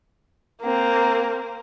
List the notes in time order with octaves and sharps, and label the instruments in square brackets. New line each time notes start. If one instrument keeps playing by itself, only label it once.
[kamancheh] A#3 C4